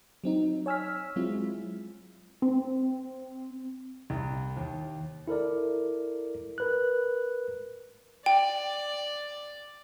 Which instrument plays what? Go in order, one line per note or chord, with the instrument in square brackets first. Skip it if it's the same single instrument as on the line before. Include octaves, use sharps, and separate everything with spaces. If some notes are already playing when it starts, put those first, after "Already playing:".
[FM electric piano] F#3 C4 D#4
C#5 G#5 E6 F6 B6
F#3 G#3 C4 E4 F4
[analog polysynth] C4
[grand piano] C2
D#2
[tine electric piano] E4 A4 A#4 D5
A#4 B4 F#6
[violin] D5 [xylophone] G5